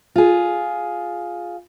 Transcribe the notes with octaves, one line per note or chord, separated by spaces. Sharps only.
F4 G#4